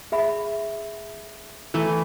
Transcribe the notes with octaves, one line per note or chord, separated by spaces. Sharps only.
G#4 E5 B5
E3 A3 E4